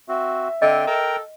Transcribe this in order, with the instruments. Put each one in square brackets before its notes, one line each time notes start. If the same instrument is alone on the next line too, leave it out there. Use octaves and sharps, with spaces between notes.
[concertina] C4 F#4 [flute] E5
[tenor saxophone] D3 [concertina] C4 G5 [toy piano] D#5
[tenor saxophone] A4 [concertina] A#4 G5 A#5